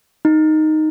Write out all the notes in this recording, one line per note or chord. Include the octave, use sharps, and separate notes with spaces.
D#4